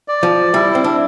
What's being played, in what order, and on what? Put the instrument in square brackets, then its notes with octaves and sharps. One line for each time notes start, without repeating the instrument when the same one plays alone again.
[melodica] D5
[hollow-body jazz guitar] F3
[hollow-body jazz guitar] G3 [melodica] E4
[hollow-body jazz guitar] C4
D4